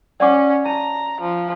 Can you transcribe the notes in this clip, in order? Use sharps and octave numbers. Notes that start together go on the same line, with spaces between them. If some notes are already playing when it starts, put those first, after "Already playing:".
C#4 D5 F#5 D6
A5 A#5
F3